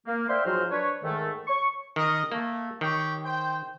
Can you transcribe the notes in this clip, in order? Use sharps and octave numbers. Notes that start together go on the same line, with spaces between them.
A#3
C5 D5 E5 F5 G5 C6
G#2 F3 F#3 F#4 C5 F6
D4 B4 C#5
G#2 D#3 A3
C#6
D#3 A#4 D#5
A3 A#3
D#3 G4 C#5 G5
C5 G5